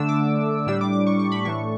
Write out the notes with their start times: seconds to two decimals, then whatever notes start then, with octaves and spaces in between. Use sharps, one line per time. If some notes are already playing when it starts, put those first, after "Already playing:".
Already playing: D3 A3 D4 E6
0.09 D6
0.67 A2 G3 D4 E6
0.81 D6
0.93 D6
1.07 C#6
1.19 C#6
1.32 B5
1.45 A2 E3 A3 D4 C#6